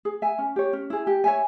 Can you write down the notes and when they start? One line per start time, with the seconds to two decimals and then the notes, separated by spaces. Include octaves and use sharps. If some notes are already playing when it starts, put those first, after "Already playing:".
0.05 G#4
0.22 E5 G#5
0.38 C#4
0.56 G4 C#5
0.73 C#4
0.90 E4 G#4
1.07 G4
1.24 C#5 E5 G#5